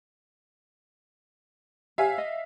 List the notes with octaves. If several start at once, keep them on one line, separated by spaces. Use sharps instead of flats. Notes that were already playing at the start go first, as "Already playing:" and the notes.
G4 C#5 E5 F5 G#5
D#5